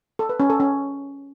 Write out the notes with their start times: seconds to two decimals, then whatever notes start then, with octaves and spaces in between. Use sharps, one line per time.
0.19 A4
0.29 B4
0.40 C#4
0.50 A4
0.60 C#4